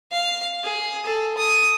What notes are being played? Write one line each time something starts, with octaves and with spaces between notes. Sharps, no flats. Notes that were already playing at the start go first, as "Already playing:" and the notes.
F5
G#4
A4
D#6